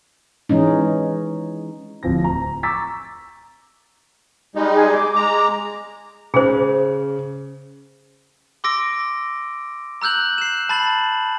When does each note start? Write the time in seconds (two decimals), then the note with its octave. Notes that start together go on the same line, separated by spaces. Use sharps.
0.49 E3 G#3 C#4 D#4
2.03 D1 F3 C4 A#6
2.24 A#5
2.63 A#5 C#6 D6 E6 A6 B6
4.55 G3 G#3 D#4
4.73 G#4
4.93 D6
5.15 G#3 A#5
6.34 C#3 G#4 C5
8.64 C6 D6 E6 A#6 D7
10.02 A#5 E6 F#6 G6 F#7
10.38 C7 E7
10.69 A5 B5 A6 F#7